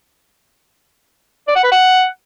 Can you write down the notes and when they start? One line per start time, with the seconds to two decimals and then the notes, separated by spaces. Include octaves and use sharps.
1.48 D5
1.56 F#5
1.64 B4
1.72 F#5